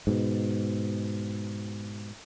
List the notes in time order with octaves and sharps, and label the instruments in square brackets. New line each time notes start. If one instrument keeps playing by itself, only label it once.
[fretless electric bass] G#2 B2